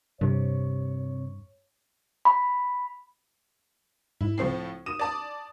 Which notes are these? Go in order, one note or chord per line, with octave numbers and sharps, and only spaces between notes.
G2 C3 C#5
B5
G#2 E4
C#2 A2 F3 A3 C4 C7
D#6 D#7 E7
D5 A5 D#6